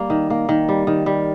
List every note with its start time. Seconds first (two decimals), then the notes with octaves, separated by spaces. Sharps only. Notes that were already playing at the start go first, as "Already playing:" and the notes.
Already playing: G3 A#3
0.10 D#3
0.30 A#3
0.49 D#3
0.69 G3
0.87 D#3
1.06 G3